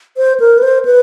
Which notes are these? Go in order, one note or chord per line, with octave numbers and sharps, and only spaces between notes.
C5
A#4
B4
C5
B4